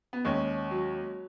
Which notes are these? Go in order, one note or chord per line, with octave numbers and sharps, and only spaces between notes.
B3
D#2 G#3 C#4
F#3